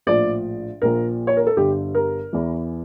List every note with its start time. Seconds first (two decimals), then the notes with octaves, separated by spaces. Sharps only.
0.07 A#1 A2 F3 D5
0.82 A#1 A#2 F3 A#4
1.27 C#5
1.37 A#4
1.47 A4
1.57 G1 G2 D3 G4
1.95 A#4
2.33 E2 E3